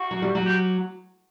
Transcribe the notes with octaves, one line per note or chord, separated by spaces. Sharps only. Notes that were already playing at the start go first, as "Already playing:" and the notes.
Already playing: F#4
F#3
G3
F#3
G4